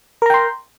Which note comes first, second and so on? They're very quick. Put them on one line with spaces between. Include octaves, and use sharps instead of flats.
A#4 A#5 G5 C6